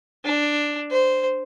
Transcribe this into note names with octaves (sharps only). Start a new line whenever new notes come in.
D4
C5